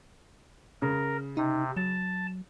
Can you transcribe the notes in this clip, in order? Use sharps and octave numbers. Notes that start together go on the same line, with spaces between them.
C#3 A#4
C3 D#4
F#3 A5